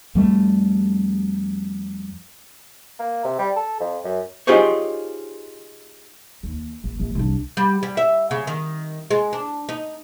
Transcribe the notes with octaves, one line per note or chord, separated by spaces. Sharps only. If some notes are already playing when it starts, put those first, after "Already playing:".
F2 G3 A3
A#3
C3
G3
A4
F2
F#2
D#4 F4 G4 G#4 C5 C#5
D#2
A#1
A#1
C2 D4
G3
G3
E5
C#3
D#3
G#3
D4
D#4